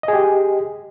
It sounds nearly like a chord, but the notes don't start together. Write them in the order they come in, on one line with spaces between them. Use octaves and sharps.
D#5 G#4 G4